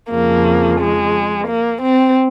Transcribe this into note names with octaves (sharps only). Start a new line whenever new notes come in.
F2 C#3 F3 A#3
G#3
A#3
C4